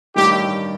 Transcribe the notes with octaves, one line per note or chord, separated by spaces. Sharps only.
A1 G2 D#3 G4